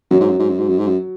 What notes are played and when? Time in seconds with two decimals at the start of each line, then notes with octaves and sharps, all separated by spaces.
0.11 F#2 F#3
0.21 G#2
0.29 F#2
0.40 G#2
0.49 F#2
0.59 G#2
0.69 F#2
0.78 G#2
0.88 F#2